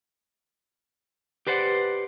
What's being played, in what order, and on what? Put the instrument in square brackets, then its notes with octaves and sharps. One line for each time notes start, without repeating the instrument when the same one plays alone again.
[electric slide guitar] G4 B4 C5 D5 F#5